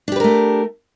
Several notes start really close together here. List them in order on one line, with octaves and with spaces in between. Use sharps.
D4 G4 B4 A#4 A3